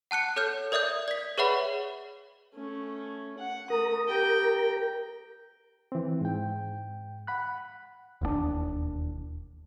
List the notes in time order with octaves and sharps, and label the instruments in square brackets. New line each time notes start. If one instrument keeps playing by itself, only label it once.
[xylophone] F#5 A5 F#6 C#7
A4 C#5 F6 G6
A#4 D5 E5 D#6 G6
D5 B6
G#4 B4 C#5 E5 F#5 B5
[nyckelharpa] A3 C#4
F#5
[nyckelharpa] A3 D#6 [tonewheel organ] A#4
[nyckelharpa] G4 G5
[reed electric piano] E3 C4
G#2 G5
F#5 B5 F#6
[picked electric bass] E1 D#2 F3 D4